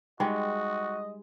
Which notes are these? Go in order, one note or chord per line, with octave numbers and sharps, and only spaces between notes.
G3 G#3 D#4 F#4 G#4 D#5 G5